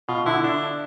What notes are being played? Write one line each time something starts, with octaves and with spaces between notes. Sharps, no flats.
B2 F4
D3 E4
D4